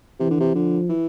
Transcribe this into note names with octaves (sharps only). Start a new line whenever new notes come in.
C3 E3
D3
C3
D3 F3
E3